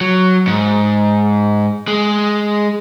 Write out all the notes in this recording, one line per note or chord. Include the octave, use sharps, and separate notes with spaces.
F#3
G#2
G#3